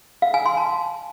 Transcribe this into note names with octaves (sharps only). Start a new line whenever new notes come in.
F5
G#5
C6
A5